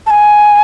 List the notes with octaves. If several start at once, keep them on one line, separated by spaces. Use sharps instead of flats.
A5
G#5